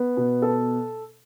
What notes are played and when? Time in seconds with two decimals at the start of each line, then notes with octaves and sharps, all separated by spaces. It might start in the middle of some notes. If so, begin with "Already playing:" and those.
Already playing: B3
0.17 B2
0.42 A4